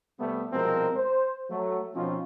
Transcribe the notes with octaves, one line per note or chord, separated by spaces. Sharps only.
C3 G3 A3 B3
C2 B2 F3 G#3 C4 A#4
C5
F#3 A3
B2 F3 C4 C#4 D#4 F4